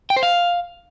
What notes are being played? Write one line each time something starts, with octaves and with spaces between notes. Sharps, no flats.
G5
C5
F5